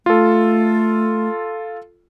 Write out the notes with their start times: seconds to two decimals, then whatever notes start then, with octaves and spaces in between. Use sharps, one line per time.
0.06 A3 F4 A4